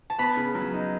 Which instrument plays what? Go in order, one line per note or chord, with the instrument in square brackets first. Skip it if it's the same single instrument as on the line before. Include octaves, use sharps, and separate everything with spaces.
[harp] A5
[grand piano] B3 [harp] B5
[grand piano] C#3
F#3
D#4